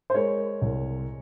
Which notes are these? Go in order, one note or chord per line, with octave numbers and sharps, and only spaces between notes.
C5
G#3 A#4 C#5
C2